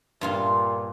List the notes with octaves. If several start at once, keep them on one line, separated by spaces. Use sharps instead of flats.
G2 A#2 F4 C6